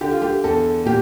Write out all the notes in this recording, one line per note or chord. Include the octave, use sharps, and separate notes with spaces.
D3 G4
F4
G4
E2 A4
A#2 G4